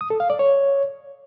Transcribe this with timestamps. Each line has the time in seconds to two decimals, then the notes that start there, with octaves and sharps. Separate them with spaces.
0.01 D#6
0.10 A4
0.20 F5
0.30 D5
0.39 C#5